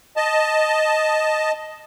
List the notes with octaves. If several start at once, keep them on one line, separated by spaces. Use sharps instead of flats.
D#5 A5